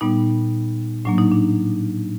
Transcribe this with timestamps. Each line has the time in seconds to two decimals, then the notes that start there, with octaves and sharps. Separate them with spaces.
0.01 A#2 G3 B3 D#4
1.05 A2 F#3 A#3 D4
1.18 D#4
1.32 D4